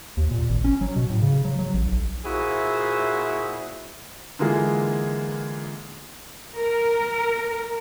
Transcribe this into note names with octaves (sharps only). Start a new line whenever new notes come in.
D#2
A#2
G#1
C#4
F#3
B2
A2
C#3
F#3
F#3
A1
B1
A#2 E4 F#4 G#4 C5 E5
D3 E3 G#3 A#3 F4 G#4
A#4